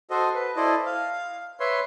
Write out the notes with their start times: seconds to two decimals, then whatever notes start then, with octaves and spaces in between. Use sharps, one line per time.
0.10 F#4 A4 C5 D#5
0.35 B4
0.56 E4 A4 C5 D5 D#5
0.86 F5
1.60 B4 C#5 E5 C6